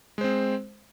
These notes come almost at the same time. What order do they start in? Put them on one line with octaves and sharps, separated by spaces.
G#3 C5 C4